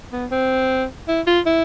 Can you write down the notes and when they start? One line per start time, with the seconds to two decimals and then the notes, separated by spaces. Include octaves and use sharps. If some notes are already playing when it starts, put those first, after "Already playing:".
0.12 B3
0.31 C4
1.08 E4
1.27 F4
1.46 E4